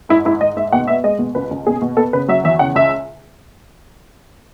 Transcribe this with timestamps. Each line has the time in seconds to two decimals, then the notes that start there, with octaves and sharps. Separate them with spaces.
0.09 G#2 E4
0.25 G#2 E4
0.41 G#2 D#5
0.56 G#2 E5
0.72 B2 F#5
0.87 B3 E5
1.04 G#3 D#5
1.19 B2
1.35 C#2 B4
1.51 C#2
1.67 B2 G#4
1.81 B2
1.97 B3 A4
2.13 C#3 B4
2.28 F#3 E5
2.44 E2 E5
2.59 C#3 F#5
2.75 C#2 E5